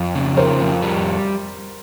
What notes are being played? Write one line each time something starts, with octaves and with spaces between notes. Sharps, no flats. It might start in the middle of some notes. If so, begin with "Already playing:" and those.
Already playing: F2
C#3
F3 A#4 C5
F2
G3